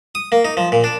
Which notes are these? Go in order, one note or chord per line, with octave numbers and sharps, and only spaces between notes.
D#6
A#3
D#4
F3
A#2
D4